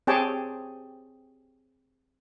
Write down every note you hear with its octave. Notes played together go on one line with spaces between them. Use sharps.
C4 G4 G#4 C#5 G5 A5